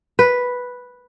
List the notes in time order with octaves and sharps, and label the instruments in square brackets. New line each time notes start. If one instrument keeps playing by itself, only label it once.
[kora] B4